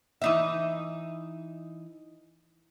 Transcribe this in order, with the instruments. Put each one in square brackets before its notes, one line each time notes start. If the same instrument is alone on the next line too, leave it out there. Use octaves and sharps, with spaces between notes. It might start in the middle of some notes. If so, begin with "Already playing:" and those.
[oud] E3 D#4 E5